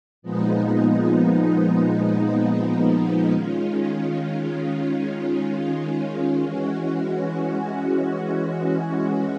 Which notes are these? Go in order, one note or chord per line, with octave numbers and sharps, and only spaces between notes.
A#2 F3 G#3 B3 D#4
D#3 G#3 C#4 F4
E3 G#3 C#4 F#4